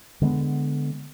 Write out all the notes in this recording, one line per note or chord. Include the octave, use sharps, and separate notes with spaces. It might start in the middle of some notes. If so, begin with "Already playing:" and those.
D3 G#3 A3 B3